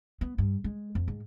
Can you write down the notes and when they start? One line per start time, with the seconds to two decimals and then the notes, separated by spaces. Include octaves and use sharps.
0.21 B3
0.38 G2
0.64 G#3
0.95 F2
1.08 G#2